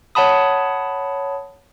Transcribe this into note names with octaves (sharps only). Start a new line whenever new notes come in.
C#5 F#5 A5 B5 D#6